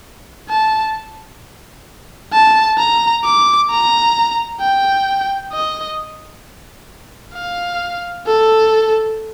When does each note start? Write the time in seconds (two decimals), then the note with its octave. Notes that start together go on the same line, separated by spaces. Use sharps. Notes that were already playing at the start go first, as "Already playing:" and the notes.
0.49 A5
2.33 A5
2.78 A#5
3.24 D6
3.70 A#5
4.60 G5
5.52 D#5
7.34 F5
8.27 A4